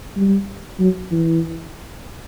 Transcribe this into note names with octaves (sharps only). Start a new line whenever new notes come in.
G3
F#3
E3